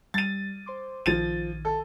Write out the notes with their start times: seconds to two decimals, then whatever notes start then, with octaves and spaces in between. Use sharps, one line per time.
0.14 G3 A6 D#7
0.66 C5 C6 D6
1.06 A#1 D#3 F3 A6 D#7
1.65 A4